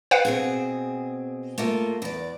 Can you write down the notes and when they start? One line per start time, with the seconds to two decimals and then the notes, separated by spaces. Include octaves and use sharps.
0.11 B4 F5 F#5
0.25 B2 C4 G#4
1.58 A3 A#3 F4
2.02 E2 D5